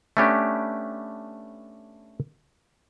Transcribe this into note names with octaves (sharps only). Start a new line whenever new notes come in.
A3 B3 C#4 D4 G4 B4